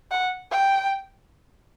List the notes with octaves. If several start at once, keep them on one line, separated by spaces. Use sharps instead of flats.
F#5
G5